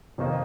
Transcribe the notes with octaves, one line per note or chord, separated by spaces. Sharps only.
F1 F2 D#3 A#3 D#4